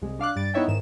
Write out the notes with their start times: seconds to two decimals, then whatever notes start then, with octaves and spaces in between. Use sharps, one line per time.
0.02 C2 G#3
0.19 D4 F5 D6 F#6
0.36 G2 G3 A6 D7
0.54 B3 D#4 E4 C#5 E5 G5
0.68 G#2 D#3 E7